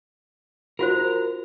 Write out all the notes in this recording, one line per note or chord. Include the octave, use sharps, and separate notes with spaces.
F4 F#4 A#4 C5